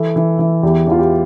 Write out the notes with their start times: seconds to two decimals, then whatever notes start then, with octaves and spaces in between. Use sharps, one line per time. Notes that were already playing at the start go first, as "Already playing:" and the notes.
Already playing: E3 A4
0.16 E3
0.39 E3
0.63 E2 G4
0.87 E2 F4
0.99 G4